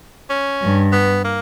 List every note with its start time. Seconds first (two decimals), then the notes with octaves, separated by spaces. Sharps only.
0.30 C#4
0.62 G2
0.93 B3
1.24 A#3